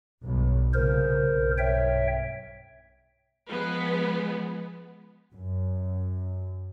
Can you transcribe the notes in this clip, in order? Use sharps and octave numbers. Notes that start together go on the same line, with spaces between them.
B1 G2 B2
C2 A#2 C#3 A#4 C5
B1 G2
C#5 E5 G5
F3 G#3 B3
F#2